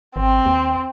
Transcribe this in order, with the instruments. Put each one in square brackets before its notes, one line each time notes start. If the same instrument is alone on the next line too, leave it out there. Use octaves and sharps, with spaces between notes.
[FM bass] G#1 [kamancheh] C4
[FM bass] D#2